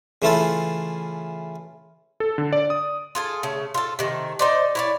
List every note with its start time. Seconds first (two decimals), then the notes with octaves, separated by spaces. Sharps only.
0.22 C#3 E3 A3 E4 F4 A4
2.20 A4
2.38 D3
2.53 D5
2.70 D#6
3.15 F4 G#4 A4
3.43 C#3 A3
3.74 F4 A4
3.99 C3 D#3 A3
4.39 D#4 C5 D5
4.75 E4 C#5 D5